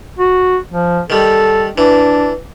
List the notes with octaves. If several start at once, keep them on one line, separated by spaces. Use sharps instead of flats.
F#4
F3
D#3 G3 A4
E3 D4